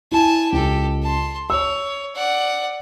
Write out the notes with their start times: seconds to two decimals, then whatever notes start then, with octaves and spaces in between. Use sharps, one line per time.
0.12 E4 G#5 A5
0.52 C#2 G4 A4
1.03 A5 C6
1.50 C#5 E6
2.15 D5 F#5